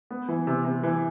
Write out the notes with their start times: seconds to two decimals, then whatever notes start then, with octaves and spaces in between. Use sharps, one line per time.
0.11 B3
0.28 E3
0.47 C3
0.65 C3
0.83 E3